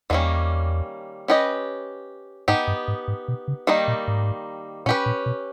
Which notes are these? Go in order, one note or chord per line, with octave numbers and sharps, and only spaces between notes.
E2 D#3 G3 A#3 C#4
C#4 G4 B4 D#5
G#2 B3 D#4 G4
G2
G#2
G#2
B2
C#3
D#3 G3 A#3 D#4
A#2
G#2
A#2 C#4 G4 B4
A#2
B2